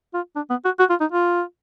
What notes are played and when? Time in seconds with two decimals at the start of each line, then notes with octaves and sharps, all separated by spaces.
0.14 F4
0.36 D4
0.50 B3
0.65 F#4
0.79 F#4
0.90 F4
1.00 D#4
1.12 F4